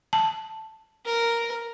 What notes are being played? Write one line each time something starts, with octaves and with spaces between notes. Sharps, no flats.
A5
A#4